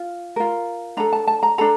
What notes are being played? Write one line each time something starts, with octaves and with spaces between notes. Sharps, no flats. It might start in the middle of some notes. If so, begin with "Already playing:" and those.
Already playing: F4
F4 A#4
D4 A4 A#5
A5
A5
A#5
D4 A4 A#5